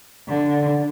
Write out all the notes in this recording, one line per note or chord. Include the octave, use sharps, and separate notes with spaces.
D3